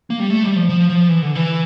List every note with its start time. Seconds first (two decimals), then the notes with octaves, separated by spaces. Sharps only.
0.10 A#3
0.20 G3
0.30 A3
0.43 G3
0.56 F3
0.69 F3
0.90 F3
1.08 E3
1.22 D3
1.35 E3